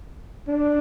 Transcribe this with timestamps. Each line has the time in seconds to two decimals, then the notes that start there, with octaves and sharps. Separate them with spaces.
0.48 D4